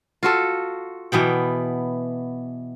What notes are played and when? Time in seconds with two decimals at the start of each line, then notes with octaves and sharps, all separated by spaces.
0.23 F4 F#4 A4
1.12 B2 E3 B3 G5